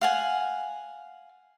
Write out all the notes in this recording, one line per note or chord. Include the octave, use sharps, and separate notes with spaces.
F5 F#5 G#5